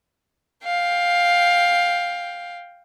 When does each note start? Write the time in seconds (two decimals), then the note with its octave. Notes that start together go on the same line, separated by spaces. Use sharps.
0.64 F5 G5